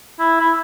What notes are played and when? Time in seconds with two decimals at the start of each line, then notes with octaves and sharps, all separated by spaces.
0.19 E4
0.40 E4